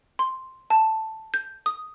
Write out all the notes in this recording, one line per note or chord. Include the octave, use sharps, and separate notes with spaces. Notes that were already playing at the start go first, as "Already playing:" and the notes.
C6
A5
G6
D#6